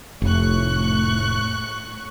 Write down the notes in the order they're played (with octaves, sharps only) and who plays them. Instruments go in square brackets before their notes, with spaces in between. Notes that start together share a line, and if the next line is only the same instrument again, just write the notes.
[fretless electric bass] F1 [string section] A2 C#6 F#6